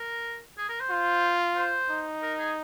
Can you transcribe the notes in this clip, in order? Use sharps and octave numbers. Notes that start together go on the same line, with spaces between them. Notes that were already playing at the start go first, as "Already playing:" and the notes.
Already playing: A#4
G#4
A#4
C5
F4
C5
D#4
A#4
G#4